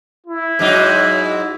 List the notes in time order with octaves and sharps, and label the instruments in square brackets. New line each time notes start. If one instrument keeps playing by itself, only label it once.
[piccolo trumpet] E4
[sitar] G#2 F#3 D#4